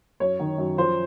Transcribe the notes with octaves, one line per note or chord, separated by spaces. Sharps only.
F#2 C#5
D#3
F#2
F3 C5